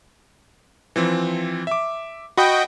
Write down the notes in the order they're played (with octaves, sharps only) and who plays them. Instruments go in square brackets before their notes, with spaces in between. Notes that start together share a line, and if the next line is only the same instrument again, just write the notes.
[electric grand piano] E3 F3 C4
E5 D6
[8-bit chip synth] F#4 D#5 G5 [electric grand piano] B5